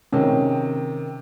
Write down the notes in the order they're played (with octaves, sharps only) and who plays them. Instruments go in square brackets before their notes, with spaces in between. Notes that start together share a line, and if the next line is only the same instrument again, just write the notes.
[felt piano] C3 D#3 [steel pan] C#4